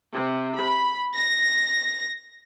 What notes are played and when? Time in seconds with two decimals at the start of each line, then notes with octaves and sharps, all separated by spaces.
0.13 C3
0.58 B5
1.14 A#6